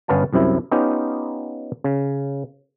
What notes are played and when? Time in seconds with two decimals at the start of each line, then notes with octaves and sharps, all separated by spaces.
0.08 G1 B3 C#4 B4 F5 A5
0.33 C2 F#2 C3 E4
0.72 B3 C#4 D#4 F4 G4
1.84 C#3